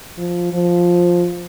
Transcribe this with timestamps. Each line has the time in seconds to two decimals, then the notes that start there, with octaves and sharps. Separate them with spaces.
0.18 F3
0.53 F3